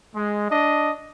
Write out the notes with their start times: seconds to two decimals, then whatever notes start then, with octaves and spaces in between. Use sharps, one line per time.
0.15 G#3
0.51 D4 D#5